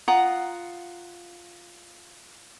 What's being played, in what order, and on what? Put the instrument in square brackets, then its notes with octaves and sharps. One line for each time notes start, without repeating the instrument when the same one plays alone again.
[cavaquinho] F4 F#5 A#5 D#6